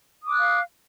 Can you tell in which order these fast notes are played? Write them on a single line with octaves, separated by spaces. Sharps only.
D#6 D6 F#6 F5